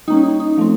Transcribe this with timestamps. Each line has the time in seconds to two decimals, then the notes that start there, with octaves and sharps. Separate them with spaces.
0.08 G3 A#3 C#4 D#4
0.23 D#4
0.40 D#4
0.57 F3 A3 C4